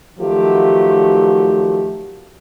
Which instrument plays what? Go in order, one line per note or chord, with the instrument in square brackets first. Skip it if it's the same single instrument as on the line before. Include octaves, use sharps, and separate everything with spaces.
[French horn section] D#3 F3 F#3 A3 F#4 G4